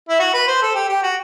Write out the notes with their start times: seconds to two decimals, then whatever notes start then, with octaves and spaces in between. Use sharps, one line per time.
0.09 E4
0.20 F#4
0.34 B4
0.48 C5
0.62 A4
0.75 G4
0.89 G4
1.03 F#4